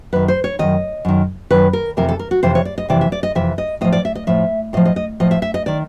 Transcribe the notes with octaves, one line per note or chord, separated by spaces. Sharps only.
F#2 D#3 B4
C5
C#5
F#2 D#3 D#5
F#2 D#3
F#2 D#3 B4
A#4
F2 C3 E3 A#4
A4
A#4
F#4
F2 C3 E3 C5
C#5
D5
D#5
F2 C3 E3 D5
E5
D5
D#5
F2 C3 E3 E5
D#5
A2 F3 D#5
D5
E5
D#5
A2 F3 E5
A2 F3 D#5
D#5
D#5
A2 F3 D#5
E5
E5
D#5
D#3 D5